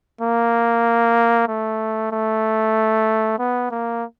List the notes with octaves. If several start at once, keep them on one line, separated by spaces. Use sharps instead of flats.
A#3
A3
A3
B3
A#3